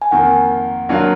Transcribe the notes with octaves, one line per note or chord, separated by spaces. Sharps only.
G#5
F2 D#3 A#3 F#5
D#3 F#3 A#3 D4 F4